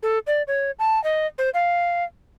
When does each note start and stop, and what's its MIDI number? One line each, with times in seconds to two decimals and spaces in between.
0.03 0.19 69
0.27 0.42 74
0.47 0.71 73
0.79 1.02 81
1.04 1.27 75
1.38 1.50 72
1.54 2.04 77